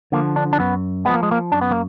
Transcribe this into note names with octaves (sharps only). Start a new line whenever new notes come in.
D3 F3 A#3
D4
D4
F#2 B3
F3 G#3 B3
A#3
G#3
A#3
F#2 D4
B3
A#3